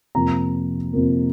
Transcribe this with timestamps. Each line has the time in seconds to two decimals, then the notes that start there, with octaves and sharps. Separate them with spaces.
0.15 F2 C3 F3 A#3 A#5
0.93 F2 C3 F3 A#3